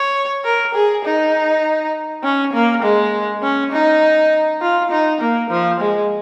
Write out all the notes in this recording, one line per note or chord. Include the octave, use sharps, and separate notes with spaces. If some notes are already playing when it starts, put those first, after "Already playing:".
Already playing: C#5
A#4
G#4
D#4
C#4
A#3
G#3
C#4
D#4
F4
D#4
A#3
F3
G#3